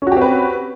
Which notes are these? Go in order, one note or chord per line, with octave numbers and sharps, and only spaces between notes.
C4 C#4 F#4 G4 B4